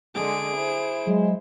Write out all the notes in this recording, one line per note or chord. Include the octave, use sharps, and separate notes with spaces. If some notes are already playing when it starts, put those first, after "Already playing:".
D3 G#3 G#4 D7
E4 C5
F#3 G#3